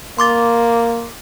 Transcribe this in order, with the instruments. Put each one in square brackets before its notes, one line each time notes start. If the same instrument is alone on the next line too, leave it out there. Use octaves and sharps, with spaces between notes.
[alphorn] A#3 [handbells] C6 D6 A6